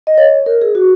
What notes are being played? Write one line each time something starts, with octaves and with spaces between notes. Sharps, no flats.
D#5
C#5
A#4
G#4
F#4